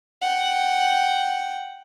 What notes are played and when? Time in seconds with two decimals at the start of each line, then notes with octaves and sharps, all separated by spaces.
0.22 F#5 G5